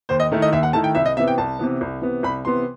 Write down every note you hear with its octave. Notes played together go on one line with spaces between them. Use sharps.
D#2 C5
D#5
D#3 A3 E4
D#5
D#2 E5
F#5
D#3 A3 E4 A5
G5
C2 E5
D#5
C3 E3 B3 E5
G5
C2 A5
C3 E3 B3
C2
C3 E3 B3
C2 B5
C3 E3 B3 C6